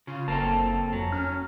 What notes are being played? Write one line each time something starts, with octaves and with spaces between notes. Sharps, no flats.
C#3 F4
F#1 A#3 C4 A4 A5
F2 F#3
C#4 F6